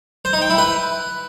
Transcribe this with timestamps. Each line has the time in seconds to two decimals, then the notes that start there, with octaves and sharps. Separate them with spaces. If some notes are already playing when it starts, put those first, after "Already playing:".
0.25 C5
0.33 D#4
0.42 G5
0.50 E4
0.58 B4